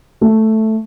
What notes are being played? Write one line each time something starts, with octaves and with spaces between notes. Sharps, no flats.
A3